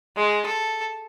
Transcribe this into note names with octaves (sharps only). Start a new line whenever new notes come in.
G#3
A4